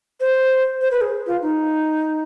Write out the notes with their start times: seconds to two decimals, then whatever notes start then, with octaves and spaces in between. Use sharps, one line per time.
0.20 C5
0.81 C5
0.91 B4
1.01 G#4
1.27 F4
1.42 D#4